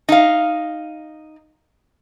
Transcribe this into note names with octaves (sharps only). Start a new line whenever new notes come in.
D#4 F5